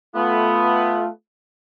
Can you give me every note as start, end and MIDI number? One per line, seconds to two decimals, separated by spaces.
0.15 1.09 57
0.15 1.05 59
0.15 1.09 65